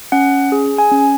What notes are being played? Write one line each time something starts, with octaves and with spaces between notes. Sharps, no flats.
C#4 F#5
G#4
G#5
C#4